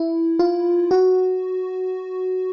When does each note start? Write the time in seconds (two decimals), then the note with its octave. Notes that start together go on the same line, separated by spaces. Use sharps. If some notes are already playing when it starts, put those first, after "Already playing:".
Already playing: E4
0.39 F4
0.91 F#4